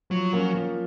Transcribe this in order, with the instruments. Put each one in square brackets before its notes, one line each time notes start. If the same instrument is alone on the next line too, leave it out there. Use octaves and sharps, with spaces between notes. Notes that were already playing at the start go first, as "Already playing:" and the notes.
[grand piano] F3 [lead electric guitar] F#3
[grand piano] A#3 C#4 F4
F3